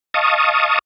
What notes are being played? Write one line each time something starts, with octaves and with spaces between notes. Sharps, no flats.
D#5 F5 A5 C#6 D#6